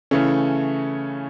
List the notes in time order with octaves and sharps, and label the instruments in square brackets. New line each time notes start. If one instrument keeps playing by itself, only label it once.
[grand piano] C#3 E3 A3 C#4